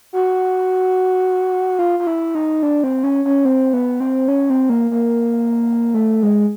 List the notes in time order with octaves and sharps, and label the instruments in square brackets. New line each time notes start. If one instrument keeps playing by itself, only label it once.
[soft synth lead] F#4
F4
F4
E4
D#4
D4
C4
C#4
C#4
C4
B3
C4
C#4
C4
A#3
A#3
A3
G#3